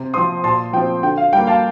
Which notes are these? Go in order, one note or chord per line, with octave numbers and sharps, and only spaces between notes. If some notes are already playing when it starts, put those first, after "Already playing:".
Already playing: C3
F3 C4 C6 D#6
A#2 A5 C6
F3 C4 G5
D3 G5
F5
G3 A#3 G5
F5 A5